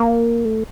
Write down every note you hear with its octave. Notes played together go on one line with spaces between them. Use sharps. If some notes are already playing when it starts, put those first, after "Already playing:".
Already playing: A#3
A3